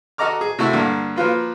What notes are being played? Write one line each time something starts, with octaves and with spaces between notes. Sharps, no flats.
F#4 A4 D#5 A#5 D6 F6
G#4
C3 A3 E4 F#4
G2 D3 A#3
F3 A#3 F4 B4